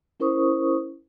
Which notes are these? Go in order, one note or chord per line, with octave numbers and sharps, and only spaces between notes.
C#4 E4 A#4 C5 C#6 D#6